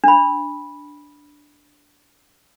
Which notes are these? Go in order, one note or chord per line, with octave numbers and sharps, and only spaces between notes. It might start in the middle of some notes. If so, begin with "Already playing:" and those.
D4 B5